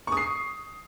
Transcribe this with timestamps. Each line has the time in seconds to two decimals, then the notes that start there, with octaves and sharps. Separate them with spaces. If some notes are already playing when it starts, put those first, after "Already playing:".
0.07 C#6
0.12 D#6
0.17 C7